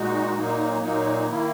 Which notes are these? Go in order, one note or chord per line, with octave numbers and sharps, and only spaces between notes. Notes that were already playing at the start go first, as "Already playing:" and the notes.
Already playing: A#2 G#3 D#4 F#4
A#2 F#3 A#3 D#4
A#2 F#3 A#3 D#4
D#3 A#3 E4